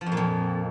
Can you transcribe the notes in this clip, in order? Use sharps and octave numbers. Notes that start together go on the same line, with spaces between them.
F3
F2
A#2
F2